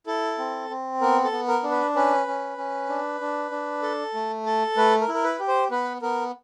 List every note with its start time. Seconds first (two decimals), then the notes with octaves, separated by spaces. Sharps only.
0.07 E4 A4
0.38 C4
0.70 C4
1.01 B3 A#4
1.24 A4
1.32 B3
1.48 A#4
1.63 D4
1.71 B4
1.95 C#4 B4
2.27 C#4
2.58 C#4
2.89 D4
3.21 D4
3.51 D4
3.82 A4
4.14 A3
4.46 A4
4.77 A3 B4
5.01 A#4
5.08 E4
5.14 A#4
5.24 B4
5.39 G4
5.48 C5
5.71 B3 B4
6.02 B3 A#4